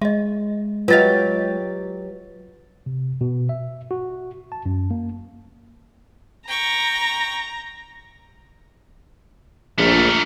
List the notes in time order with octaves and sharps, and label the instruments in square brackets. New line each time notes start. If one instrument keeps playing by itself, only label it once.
[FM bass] G#3 [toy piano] D#5 E5
[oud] F#3 G4 F5 [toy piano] F4 D#5 [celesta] B4 A6
[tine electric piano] C3
B2
E5
F#4
A5
F#2
A#3
[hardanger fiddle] G5 C#6 [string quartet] A#5
[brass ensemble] A#1 [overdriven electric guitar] A3 A#4